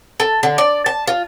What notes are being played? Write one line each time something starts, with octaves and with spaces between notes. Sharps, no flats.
A4
D3
D5
A5
F4